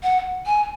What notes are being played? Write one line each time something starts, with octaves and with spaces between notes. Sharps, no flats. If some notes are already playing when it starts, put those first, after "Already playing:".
F#5
G#5